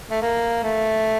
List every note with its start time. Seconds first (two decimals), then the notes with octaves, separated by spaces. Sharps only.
0.10 A3
0.22 A#3
0.64 A3